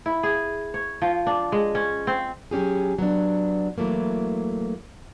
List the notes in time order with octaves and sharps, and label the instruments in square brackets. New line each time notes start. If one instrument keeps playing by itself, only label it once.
[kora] E4
G#4
C#5
F3
D4
G#3
C#4
C4
[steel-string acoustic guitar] F#3 C#4 G4 G#4
F#3 B3 D4
E3 F#3 A3 A#3